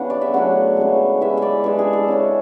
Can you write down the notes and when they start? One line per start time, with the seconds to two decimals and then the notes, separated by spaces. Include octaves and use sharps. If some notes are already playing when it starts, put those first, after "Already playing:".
Already playing: C#3 E3 B3 D4 F#5
0.10 D5
0.21 E5
0.34 C#3 F#3 A3 D4 F#5
0.77 C#3 E3 G#3
1.21 E3 G#3 C#4 E5
1.37 D5 E5
1.64 E3 G#3 D4 A4
1.79 G#4
1.93 A4
2.08 C#3 G#3 C#4